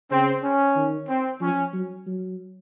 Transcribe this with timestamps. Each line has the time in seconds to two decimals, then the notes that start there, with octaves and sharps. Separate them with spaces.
0.11 C#3 C4
0.43 C#4
0.76 D#3
1.08 C4
1.41 F3 C#4
1.73 F#3
2.06 F#3